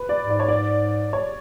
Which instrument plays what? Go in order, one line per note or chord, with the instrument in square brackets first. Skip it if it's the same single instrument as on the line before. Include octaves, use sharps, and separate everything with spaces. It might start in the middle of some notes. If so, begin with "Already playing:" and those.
Already playing: [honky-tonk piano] B4
D5
[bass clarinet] G#2
[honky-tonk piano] D5
C#5
D5
C#5